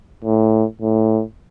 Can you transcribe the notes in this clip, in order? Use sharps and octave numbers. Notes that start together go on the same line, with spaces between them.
A2
A2